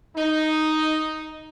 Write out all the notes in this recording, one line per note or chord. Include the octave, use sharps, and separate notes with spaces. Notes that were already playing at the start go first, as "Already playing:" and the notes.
D#4